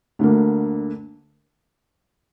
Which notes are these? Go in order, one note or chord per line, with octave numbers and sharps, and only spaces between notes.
D2 D3 A#3